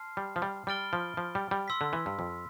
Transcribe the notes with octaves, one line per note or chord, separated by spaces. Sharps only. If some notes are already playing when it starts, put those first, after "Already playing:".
Already playing: A5 C6 F6 C7
G3
F3
G3
G3 B5 F6 A6 D7 G7
F3
F3
G3
G3
C6 E6 B6
D3
E3
G2
F2